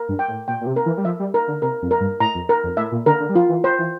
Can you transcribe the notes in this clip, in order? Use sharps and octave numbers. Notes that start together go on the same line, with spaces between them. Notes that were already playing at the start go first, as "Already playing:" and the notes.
Already playing: A#4
G2
G5
A2
A#2 G5
A#2
C3
A#4
E3
G3
F3 E5
G3
A#4
D3
C3 A#4
F2
A#4
G2
A2 A#5
F2
A#4
F2
A2 E5
A#2
D3 A#4
D3
G3
F3 F4
E3
C5
E3